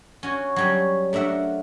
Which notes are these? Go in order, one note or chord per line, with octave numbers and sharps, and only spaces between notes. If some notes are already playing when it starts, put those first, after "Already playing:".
C#4 F#4 G#5
F#3 G3 C#4
A3 D4 A#4 E5 F#5